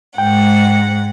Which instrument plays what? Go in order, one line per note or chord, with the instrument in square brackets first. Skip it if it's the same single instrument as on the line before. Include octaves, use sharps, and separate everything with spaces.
[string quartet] G#2 F#5 [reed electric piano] G5